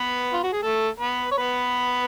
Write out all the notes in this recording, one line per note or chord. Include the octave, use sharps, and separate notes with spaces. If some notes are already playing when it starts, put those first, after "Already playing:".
Already playing: B3 B4
F4
F#4
G#4
A3 A4
B3 B4
C#5
B3 B4